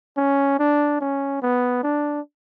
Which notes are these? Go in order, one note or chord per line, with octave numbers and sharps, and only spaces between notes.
C#4
D4
C#4
B3
D4